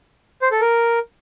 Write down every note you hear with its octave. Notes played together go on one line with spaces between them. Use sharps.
C5
A4
A#4